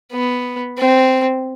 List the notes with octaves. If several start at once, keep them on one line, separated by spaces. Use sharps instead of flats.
B3
C4